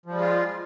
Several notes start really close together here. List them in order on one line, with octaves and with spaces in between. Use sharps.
F3 G3 G#3 F4